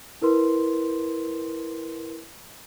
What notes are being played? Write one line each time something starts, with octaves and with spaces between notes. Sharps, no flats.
E4 A#4 B4 C6